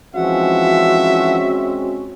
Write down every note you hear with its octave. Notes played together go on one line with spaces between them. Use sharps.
E3 F3 G#3 C4 C#4 F#4 E5 F#5